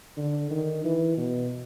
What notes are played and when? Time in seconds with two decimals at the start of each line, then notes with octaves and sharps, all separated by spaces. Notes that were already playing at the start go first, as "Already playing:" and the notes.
0.17 D3
0.50 D#3
0.84 E3
1.18 B2